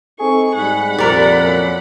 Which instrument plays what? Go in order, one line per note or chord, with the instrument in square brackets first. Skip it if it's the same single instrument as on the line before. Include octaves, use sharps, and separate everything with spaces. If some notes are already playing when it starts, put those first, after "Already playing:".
[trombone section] C4 D#4 A4 [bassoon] G#4 [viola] C#6
[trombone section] G#2 G3 D#4 [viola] F#5 B5
[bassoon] C2 [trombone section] F2 A#2 [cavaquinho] A#4 D5
[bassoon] F#2